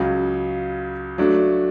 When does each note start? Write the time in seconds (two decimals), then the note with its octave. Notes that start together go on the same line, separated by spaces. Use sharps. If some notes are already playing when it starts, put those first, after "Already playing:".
Already playing: C#2 C#3 F#3
1.18 F#3 A3 D4